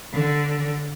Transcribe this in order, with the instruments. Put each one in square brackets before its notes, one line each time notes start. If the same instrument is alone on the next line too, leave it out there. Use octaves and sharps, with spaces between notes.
[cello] D3